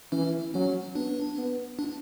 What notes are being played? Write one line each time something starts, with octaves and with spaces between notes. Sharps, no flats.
E3 C#4
F#3 C#4
B3 D4
B3
D4